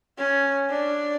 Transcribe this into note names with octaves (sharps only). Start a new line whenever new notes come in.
C#4
D4